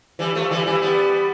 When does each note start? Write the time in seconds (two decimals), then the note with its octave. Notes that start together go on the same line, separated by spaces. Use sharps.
0.19 E3 G3
0.35 F3 A3
0.51 E3 G3
0.66 E3 G3
0.82 G3 B3